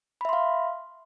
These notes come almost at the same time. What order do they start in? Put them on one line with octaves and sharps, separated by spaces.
B5 E5 C6 F5